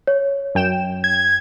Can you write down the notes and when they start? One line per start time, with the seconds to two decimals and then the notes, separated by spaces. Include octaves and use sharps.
0.07 C#5
0.55 F#2 G5 E7
1.04 G#6